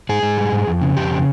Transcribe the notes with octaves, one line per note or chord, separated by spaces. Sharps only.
G#2 G#4
G#2
G3
G#2
F2
C#3
F2 G4
C#3